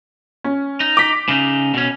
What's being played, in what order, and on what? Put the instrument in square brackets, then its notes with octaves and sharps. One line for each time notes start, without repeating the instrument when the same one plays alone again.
[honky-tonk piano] C#4
[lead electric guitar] D#4
[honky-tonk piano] D6 B6
[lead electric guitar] C#3 D#4
B2 C#4